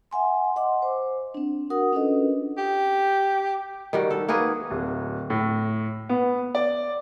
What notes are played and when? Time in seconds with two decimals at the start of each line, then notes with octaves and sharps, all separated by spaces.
0.11 E5 F#5 G#5 C6
0.56 D#5 F#5 C6 D6
0.82 C5
1.34 C4 D4
1.70 F#4 A#4 F#5 D#6
1.93 C#4 D4 F4 A4 B4 D#5
2.58 G4
3.93 D#3 G3 F#4
4.10 A4
4.28 A#3 F#4 G#4 B4
4.70 D1
5.30 A2
6.09 B3
6.55 D5